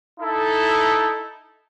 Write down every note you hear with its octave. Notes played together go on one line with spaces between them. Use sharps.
D#4 E4 A4